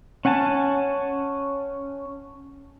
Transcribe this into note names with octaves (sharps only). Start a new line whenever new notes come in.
C#4 F#5 G#5 A5